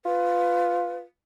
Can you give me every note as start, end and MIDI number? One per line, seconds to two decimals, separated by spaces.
0.05 1.04 65
0.05 0.99 71